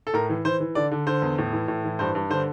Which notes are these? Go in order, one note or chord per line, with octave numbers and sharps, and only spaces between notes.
A4
A2 A#4
E3
E3 C5
E3
D3 D5
D3
D3 C5
E2
A2
E3
A2
E3
G2 C5
G2
D3 C5